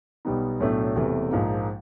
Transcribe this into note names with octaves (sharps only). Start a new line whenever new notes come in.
B1 B2 G3 B3 D#4
B1 A2 F#3 A3 D4
E1 E2 C3 E3 A3
A#1 G#2 F3 A#3 D#4